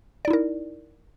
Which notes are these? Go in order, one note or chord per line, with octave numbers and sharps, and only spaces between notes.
D#4 E4 A#4 D5